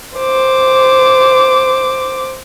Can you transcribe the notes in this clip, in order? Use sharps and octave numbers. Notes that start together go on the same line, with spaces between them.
C5 D6